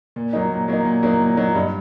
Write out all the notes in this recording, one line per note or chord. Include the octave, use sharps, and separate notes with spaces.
A#2
F#3 A#3 D#4
A#2
F#3 A#3 D#4
A#2
F#3 A#3 D#4
A#2
F#3 A#3 D#4
G2